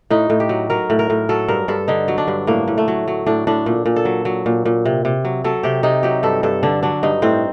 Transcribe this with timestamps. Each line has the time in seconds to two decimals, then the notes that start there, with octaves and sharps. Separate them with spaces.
0.10 A2 D#4
0.30 A2
0.40 G4
0.49 F#3
0.70 F#3 A#4
0.90 A2
0.99 A#4
1.10 A2
1.29 F#3 A4
1.48 G2 A#4
1.68 G2 A4
1.88 D3 D#4
2.08 F#3
2.18 D4
2.28 G2
2.47 A2 A#3
2.68 A2
2.78 A3
2.88 F#3
3.08 F#3
3.26 A2 D4
3.47 A2 D4
3.66 A#2
3.86 A#2
3.96 A4
4.05 F#3
4.25 F#3
4.46 A#2
4.65 A#2
4.85 C3
5.05 C3
5.25 F#3
5.44 F#3 A4
5.63 C3 G4
5.83 C3 D#4
6.03 F#3 G4
6.23 G2 A4
6.43 G2 A4
6.63 D3 D4
6.83 F#3 D4
7.03 G2 D#4
7.22 A2 C4